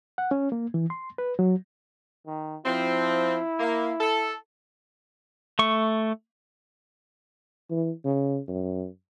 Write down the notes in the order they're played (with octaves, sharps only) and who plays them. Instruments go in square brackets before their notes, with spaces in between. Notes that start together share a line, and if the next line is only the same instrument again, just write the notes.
[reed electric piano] F#5
C#4
A#3
E3
C6
B4
F#3
[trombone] D#3
[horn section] F3 C4 [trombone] E4
[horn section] A#3
A4
[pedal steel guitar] A3 C#6
[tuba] E3
C#3
F#2